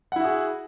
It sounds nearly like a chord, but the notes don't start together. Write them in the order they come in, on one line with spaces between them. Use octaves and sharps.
F#5 E4 F#4 G#4